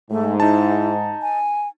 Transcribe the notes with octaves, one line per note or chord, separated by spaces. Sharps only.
G#2 A3
D#4 E4 A5
G#5